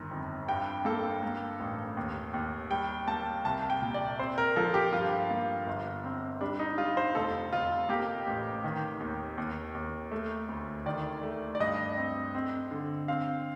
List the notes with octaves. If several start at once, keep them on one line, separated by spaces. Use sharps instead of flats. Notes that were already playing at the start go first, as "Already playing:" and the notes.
Already playing: G1 D#3
F2
G2 G5
A#3 A4
A#3
A1
D#2
D#2
G3 G5
A#3 A5
C2 A5
G5
A#2
D5
C4 C5
A#4
F3 A4
G4
G2 F4
A#3
G1
C4
G3 D4
D#4
G3 F4
C5
F1 A4
F1 F4
A#3 G4
A1
D#3
D#2
D#2
D#2
A3
D2
D#3 D5
A3
D5
G2 D#5
C4
C4
D3
C4 F5